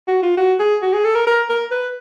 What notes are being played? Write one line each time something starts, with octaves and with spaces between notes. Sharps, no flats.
F#4
F4
F#4
G#4
F#4
G#4
A4
A#4
A#4
A#4
B4